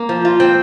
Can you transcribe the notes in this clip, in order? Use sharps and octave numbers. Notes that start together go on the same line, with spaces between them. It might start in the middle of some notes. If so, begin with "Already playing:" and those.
Already playing: A#3
F3
F4
C4 G5